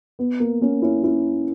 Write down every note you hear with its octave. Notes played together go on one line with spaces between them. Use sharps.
B3
A#3
A#3 C#4
C#4 E4
C#4 E4